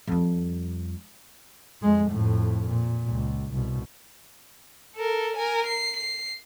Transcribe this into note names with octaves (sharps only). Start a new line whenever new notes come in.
F2 G3
F2 G#3
F2 A2
A#2
C#2
C2 B2
A4 A#4
A#4 G#5
C7
C7